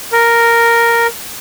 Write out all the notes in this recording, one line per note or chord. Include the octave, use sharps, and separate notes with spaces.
A#4